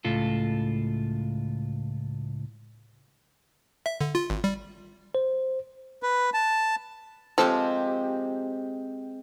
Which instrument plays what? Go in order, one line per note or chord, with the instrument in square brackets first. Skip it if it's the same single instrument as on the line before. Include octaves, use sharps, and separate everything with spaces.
[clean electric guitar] C#2 A2 F4 A4
[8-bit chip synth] E5
D3
F4
G#1
G3
[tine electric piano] C5
[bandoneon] B4
A5
[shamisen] F3 A4 [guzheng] G#3 C4 G4